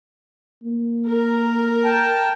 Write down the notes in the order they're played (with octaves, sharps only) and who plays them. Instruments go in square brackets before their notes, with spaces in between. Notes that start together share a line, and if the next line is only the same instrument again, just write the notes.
[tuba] A#3
[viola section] A#4
[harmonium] G5 A5